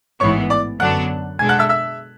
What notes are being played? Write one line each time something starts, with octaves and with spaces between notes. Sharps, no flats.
A1 G#2 E3 B3 C#5 C#6
D5 D6
F#2 D3 F#3 B3 D4 F#5 F#6
B2 G#3 D4 A4 G#5 G#6
F#5 F#6
E5 E6
E5 E6